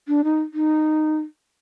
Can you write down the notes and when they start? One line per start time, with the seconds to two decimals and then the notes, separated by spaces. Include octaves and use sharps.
0.08 D4
0.24 D#4
0.54 D#4